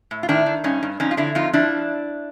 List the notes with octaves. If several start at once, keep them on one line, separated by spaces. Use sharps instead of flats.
A2
F4
D#3 D4 E4
D#3
G2 C#4 D#4
G2
F2 C#4 D#4
F4
D3 D4 E4
F2 D#4 F4
F3 D4 E4